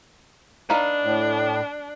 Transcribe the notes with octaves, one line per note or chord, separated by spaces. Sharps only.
D4 D#4 B4 F5
A2